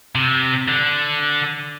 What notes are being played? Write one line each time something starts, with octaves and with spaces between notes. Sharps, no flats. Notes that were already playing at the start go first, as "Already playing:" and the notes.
C3
D3